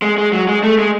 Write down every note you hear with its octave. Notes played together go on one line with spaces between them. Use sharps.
G#3
G#3
F#3
G#3
A3
G#3